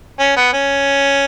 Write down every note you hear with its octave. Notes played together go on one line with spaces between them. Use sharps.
C#4
B3
C#4